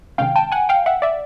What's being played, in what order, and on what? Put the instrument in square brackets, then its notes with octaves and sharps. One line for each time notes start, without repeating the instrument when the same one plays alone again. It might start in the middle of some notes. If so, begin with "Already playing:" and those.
[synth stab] C3 D#3 G#3 C#4 F5 G5
G5 A5
F#5 G#5
F5 G5
E5 F#5
D5 E5